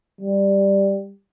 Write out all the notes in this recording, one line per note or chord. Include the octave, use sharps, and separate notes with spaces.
G3